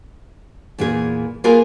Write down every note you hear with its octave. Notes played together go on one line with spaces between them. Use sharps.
E2 A#2 E3 G#4
A#3 F4 G#4 A#4 B4 G#5